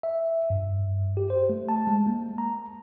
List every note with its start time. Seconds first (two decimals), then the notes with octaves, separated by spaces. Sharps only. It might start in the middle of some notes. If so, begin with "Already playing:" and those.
0.03 E5
0.50 G2
1.17 G4
1.30 C5
1.50 A3
1.69 A5
1.87 G#3
2.07 A#3
2.38 A#5